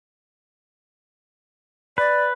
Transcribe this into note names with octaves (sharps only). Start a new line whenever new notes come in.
B4 D5